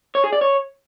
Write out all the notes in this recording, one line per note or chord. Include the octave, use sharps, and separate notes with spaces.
C#5
G#4
D5
C#5